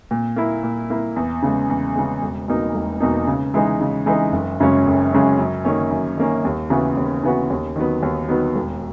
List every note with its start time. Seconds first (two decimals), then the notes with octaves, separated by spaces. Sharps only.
0.11 A#2
0.36 A#3 E4
0.63 A#2
0.90 A#3 E4
1.16 E2
1.42 C#3 G#3
1.70 E2
1.95 C#3 G#3
2.22 E1
2.48 E2 B2 A#3 D#4
2.74 E1
3.00 E2 B2 A#3 D#4
3.27 C#3
3.54 E3 G#3 D#4
3.81 C#3
4.06 E3 G#3 D#4
4.32 F#1
4.60 F#2 C#3 G#3 C#4
4.86 F#1
5.12 F#2 C#3 G#3 C#4
5.39 F#2
5.65 D#3 A#3 C#4
5.91 F#2
6.17 D#3 A#3 C#4
6.45 D#2
6.70 C#3 E3 B3 F#4
6.97 D#2
7.23 C#3 E3 B3 F#4
7.50 D#2
7.76 D#3 F#3 B3
8.03 D#2
8.29 D#3 F#3 B3
8.56 E1